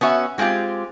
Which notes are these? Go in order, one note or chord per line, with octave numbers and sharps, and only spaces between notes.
B3 C#4 F#4 E5
F#3 G#3 C4 F4 G4